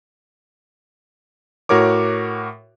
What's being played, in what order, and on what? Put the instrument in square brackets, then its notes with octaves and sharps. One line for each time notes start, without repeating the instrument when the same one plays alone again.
[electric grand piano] A2 F#4 A#4 C#5 D6